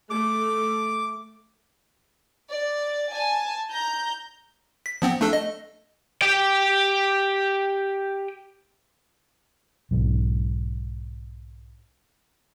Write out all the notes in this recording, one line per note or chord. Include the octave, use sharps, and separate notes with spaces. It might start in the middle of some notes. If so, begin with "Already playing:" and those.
A3 D6
D5
G#5 A5
A#5 G6
B6
F3 B3 C4
A3 D4 A4
D#5
G4 G5
B1 G#2